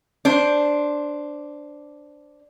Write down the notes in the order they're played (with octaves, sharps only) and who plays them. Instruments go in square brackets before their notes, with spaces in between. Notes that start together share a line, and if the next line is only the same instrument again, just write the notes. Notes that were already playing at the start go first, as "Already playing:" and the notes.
[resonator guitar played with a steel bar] D4 C5